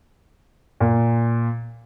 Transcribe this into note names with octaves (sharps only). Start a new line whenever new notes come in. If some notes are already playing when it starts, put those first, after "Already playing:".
A#2